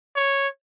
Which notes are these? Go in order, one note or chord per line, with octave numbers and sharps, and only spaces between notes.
C#5